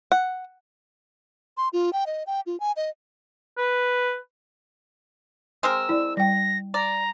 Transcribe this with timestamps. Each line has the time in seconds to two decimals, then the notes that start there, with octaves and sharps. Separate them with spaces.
0.12 F#5
1.57 C6
1.73 F4
1.93 G5
2.06 D#5
2.27 G5
2.46 F4
2.60 G#5
2.77 D#5
3.58 B4
5.63 G#3 C4 A#4 E6
5.89 E4 D5
6.17 G3 G5 A#6
6.74 D5 A#5